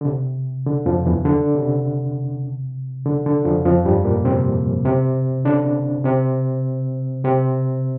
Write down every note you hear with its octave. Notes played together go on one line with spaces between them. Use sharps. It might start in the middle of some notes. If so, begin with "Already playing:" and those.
D3
C3
D3
F2 F3
E2 E3
D3
C3
D3
D3
F2 F3
F2 F3
G2 G3
A#2 A#3
C3 C4
C3 C4
D3 D4
C3 C4
C3 C4